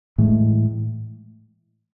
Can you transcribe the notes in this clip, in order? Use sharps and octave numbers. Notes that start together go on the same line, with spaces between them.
A2 E3 G#3